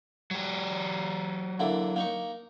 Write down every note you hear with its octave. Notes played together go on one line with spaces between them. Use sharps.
F#3 G4
D3 A#3 E4
A#3 D#4 C#6